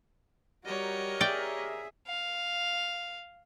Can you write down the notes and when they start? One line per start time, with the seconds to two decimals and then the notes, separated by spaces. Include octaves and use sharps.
0.65 G3 F#4 G4 A#4 C#5 D#5
1.21 G#4 D5 E5 G5
2.07 F5